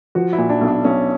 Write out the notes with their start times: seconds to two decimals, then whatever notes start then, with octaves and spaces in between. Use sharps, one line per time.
0.15 F3 F#4
0.33 E4
0.38 A#2
0.49 D4
0.61 B1
0.67 D4
0.84 B1 C#4